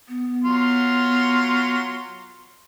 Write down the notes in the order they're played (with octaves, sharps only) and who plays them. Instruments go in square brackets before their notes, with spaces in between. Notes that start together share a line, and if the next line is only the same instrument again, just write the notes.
[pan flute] B3
[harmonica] F#3 F4 C6